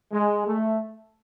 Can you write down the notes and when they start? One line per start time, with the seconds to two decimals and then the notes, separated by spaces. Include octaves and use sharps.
0.12 G#3
0.48 A3